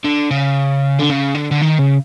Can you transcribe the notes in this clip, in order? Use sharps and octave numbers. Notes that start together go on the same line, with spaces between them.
D3
C#3
D3
C#3
D3
D3
D#3
C#3